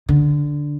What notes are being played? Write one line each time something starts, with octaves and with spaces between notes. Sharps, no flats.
D3